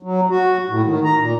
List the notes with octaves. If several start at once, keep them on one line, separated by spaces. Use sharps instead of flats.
F#3
F#4
A2
D#3
A#5
A#2